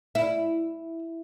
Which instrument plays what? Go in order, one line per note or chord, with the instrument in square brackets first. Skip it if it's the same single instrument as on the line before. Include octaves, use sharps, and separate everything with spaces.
[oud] E4